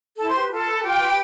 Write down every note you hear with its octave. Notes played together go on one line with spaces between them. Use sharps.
E4 A4 A5
C5 C6
G4 B4
F4 A4 A5
B4
F4 G4 G5
B4